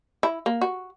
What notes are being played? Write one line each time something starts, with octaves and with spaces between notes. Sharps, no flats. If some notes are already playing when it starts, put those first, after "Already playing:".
E4
A#3
F#4